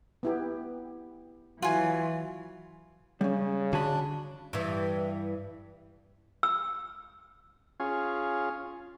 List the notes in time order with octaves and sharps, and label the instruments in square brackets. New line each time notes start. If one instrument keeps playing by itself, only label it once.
[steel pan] B3 E4 G4
[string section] E3 F#3 [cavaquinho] F4 G#5 [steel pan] F#4
[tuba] C#3 [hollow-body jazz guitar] G3 C#4
[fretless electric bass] D3 [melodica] D4 [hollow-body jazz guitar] F#4 G#5 B5
[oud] G2 E3
[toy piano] E6
[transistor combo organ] C#4 F4 G#4